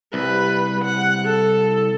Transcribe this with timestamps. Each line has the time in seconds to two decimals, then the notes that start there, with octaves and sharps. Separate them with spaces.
0.14 C2 G3 B4
0.85 F#5
1.25 A4